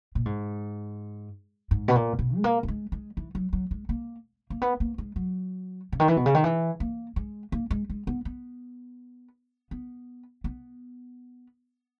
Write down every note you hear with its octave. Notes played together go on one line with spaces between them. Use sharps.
A#2
G#2
G#2
B2
A#2
B2
G#3
A#3
A#3
G#3
G#3
E3
F#3
F#3
G#3
A#3
A#3
B3
A#3
G#3
F#3
C#3
D#3
E3
B2
C#3
D#3
E3
A#3
G#3
A#3
G#3
G#3
B3
B3
B3
B3